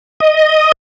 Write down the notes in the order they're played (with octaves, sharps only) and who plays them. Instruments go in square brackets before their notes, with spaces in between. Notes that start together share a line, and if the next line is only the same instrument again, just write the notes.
[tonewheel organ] D#5